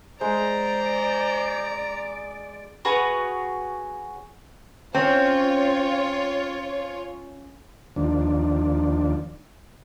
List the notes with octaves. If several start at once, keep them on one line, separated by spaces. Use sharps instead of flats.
G#3 C5 D5 A#5
F#4 G#4 B4 C#5
C4 C#4 F4 C#5
D#2 F3 D4